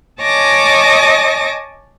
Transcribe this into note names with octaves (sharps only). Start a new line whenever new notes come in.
C#5 D#5 G#5 A5 D6 A#6